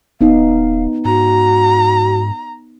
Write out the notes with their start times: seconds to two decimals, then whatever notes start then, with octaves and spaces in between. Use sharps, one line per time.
0.21 D#1 B3 D#4 F5
1.05 G#2 F#4 A#5